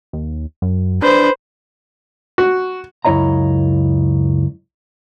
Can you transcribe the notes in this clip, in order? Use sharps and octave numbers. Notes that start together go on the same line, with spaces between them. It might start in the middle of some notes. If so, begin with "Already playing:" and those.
D#2
F#2
D4 B4 C5
F#4
C#2 F#2 E4 C#5 D#5 A#5